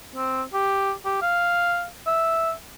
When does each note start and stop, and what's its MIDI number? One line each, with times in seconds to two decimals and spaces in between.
0.15 0.42 60
0.53 0.92 67
1.05 1.20 67
1.22 1.86 77
2.07 2.52 76